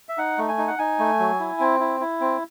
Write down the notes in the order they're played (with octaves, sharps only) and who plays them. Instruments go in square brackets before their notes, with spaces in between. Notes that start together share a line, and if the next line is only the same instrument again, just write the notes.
[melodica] E5
D#4 F#5
A3
G#5
D#4
F#5
D#4 G#5
A3
F#3
E4
C4
E4
E4
C4